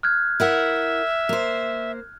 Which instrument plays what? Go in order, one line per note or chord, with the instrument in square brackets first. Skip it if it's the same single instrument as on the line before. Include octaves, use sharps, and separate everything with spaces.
[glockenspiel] F6 F#6 G#6
[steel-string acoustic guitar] E4 A#4 F#5 [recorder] E5
[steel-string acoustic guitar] A#3 C5